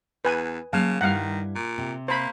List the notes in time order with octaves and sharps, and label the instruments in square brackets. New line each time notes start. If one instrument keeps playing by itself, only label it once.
[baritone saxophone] E2 [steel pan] B4 G#5
[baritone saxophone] C#3 [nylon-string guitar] F#3 A#3 A5 [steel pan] F5
[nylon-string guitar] G2 G3 E4 [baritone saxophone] D#3 [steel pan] F5 F#5
[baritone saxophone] A#2
[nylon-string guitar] C3
[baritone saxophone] A#3 [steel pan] C5 B5